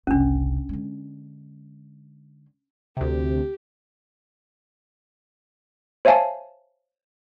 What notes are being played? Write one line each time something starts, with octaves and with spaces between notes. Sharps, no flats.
F#1 C2 C#4 D4
D3 G#3
D2 C3 G4
C5 C#5 E5 F5 G#5 A5